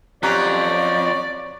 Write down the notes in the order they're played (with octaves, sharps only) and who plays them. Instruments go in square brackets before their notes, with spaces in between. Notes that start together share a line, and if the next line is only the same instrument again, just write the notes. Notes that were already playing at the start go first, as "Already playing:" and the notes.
[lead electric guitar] F2 [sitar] F#3 C#4 [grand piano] G4 A#5 F#6 [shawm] D5